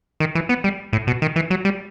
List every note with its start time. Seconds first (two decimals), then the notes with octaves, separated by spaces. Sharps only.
0.20 D#3
0.35 E3
0.49 B3
0.64 G3
0.93 A2
1.07 B2
1.22 D#3
1.36 E3
1.50 F#3
1.65 G3